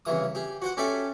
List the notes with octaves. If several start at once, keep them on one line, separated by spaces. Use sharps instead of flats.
C2 C#3 E3 D#6
G4 G#4
F#4 C5 F#5
C#4 G4 A4 D5 E5 G#5